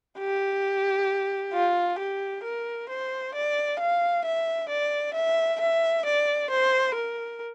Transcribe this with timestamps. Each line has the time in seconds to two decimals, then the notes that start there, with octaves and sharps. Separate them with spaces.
0.19 G4
1.53 F4
1.98 G4
2.44 A#4
2.89 C5
3.34 D5
3.79 F5
4.25 E5
4.69 D5
5.14 E5
5.60 E5
6.05 D5
6.50 C5
6.94 A#4